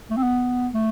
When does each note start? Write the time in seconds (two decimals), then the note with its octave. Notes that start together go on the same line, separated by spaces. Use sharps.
0.11 A3
0.17 C4
0.23 B3
0.74 A3